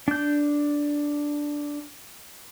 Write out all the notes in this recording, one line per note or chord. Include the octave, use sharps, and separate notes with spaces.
D4 G6